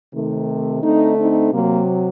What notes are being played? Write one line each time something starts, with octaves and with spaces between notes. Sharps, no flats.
C3 D#3 A3
D3 A3 C4 D#4
C4 D#4
C3 F#3 A#3